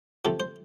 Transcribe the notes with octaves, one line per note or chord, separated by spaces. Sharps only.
C3 F3 A3 A4
C5